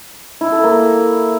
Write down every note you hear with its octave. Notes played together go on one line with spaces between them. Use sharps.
E4
A4
A#3